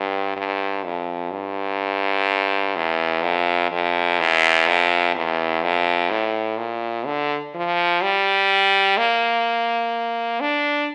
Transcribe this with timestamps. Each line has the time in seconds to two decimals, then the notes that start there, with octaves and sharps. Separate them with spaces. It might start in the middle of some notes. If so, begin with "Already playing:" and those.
Already playing: G2
0.36 G2
0.85 F2
1.32 G2
2.76 E2
3.23 F2
3.72 F2
4.20 E2
4.67 F2
5.15 E2
5.62 F2
6.10 A2
6.58 A#2
7.06 D3
7.55 F3
8.02 G3
8.98 A#3
10.41 D4